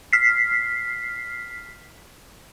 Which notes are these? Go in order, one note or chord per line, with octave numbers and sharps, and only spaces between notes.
F6 B6 C7